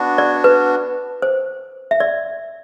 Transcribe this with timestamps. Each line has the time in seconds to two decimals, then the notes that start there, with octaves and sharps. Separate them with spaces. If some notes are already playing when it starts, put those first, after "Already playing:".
Already playing: B3 D4 F#4
0.18 D5
0.44 B4
1.22 C5
1.91 E5
2.00 D5